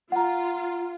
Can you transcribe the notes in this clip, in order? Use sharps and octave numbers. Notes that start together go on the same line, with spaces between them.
F4 F#5 A#5